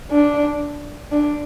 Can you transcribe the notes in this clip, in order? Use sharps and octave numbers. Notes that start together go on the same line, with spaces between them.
D4
D4